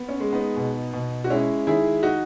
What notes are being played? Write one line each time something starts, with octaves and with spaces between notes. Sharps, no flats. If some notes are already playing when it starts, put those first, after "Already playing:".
Already playing: B3
C#4
G#3
B3 D#4
B2
B2
F#4
G#3 C#4 E4
D#3 E4 G#4
D#4 F#4